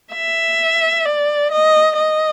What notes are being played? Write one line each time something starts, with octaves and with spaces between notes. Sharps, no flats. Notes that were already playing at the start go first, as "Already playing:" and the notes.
E5
D5
D#5
D#5